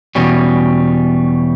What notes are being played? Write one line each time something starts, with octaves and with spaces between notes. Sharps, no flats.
E2 B2 G3 C#4